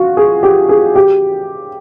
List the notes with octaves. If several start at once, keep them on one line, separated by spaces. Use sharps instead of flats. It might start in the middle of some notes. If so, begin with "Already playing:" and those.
Already playing: F4 F#4
G#4
G4
G#4
G4